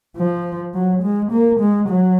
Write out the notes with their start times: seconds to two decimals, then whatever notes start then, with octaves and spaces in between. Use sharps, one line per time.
0.16 F3
0.74 F#3
1.02 G#3
1.31 A#3
1.60 G#3
1.89 F#3